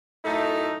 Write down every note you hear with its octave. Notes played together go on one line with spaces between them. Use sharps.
F#2 A2 A3 D#4